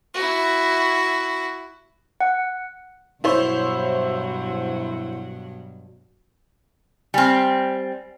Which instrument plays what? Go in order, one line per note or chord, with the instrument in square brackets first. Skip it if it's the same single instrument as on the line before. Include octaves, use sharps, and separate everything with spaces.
[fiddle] E4 F#4
[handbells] F#5
[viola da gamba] G2 B2 F#3 [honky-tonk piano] E4 C5 C#5
[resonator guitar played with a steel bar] G3 C4 [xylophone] G#5 F6